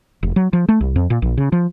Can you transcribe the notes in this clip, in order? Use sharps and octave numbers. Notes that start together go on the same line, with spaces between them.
F1
F#3
F3
A3
C2
F2
A#2
A#1
C#3
F3